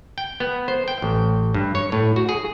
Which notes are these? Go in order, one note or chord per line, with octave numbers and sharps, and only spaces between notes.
G5
B3
C5
G5
A1
G2
C#5
A2
F#4
G#4